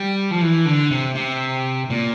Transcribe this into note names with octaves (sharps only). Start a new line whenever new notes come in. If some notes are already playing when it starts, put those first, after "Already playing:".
Already playing: G3
F3
E3
D3
C3
C3
A#2